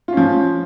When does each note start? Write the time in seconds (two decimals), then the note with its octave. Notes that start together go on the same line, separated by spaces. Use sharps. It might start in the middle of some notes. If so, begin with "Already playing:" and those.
0.08 F4
0.13 C#4
0.17 F3